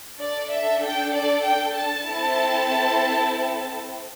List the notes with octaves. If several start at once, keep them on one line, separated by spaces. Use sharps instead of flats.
D4 A4 D5
E5
G5
D5
G5
A5
C4 E4 A4